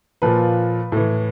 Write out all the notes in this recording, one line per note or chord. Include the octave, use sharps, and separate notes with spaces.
A#2 F3 B4
A2 E3